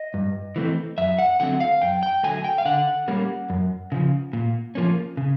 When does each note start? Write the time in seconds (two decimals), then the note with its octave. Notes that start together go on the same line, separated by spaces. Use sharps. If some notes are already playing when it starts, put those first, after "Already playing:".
Already playing: D#5
0.14 G2
0.56 E3 A3 C4
0.98 F#2 E5
1.19 F#5
1.40 D3 F#3 A3 C4 F#5
1.60 F5
1.82 F#2 G5
2.03 G5
2.23 D3 F#3 A3 G#5
2.44 G5
2.58 F5
2.65 D3 F#5
3.08 G3 A#3 C#4
3.50 F#2
3.92 C#3 F3
4.33 A#2
4.75 F3 A#3 C#4
5.17 C#3